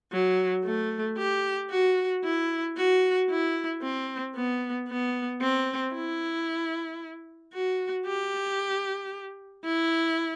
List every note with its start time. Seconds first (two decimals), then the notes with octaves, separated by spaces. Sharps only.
0.12 F#3
0.65 A3
1.18 G4
1.70 F#4
2.24 E4
2.77 F#4
3.29 E4
3.82 C4
4.35 B3
4.88 B3
5.41 C4
5.94 E4
7.53 F#4
8.06 G4
9.65 E4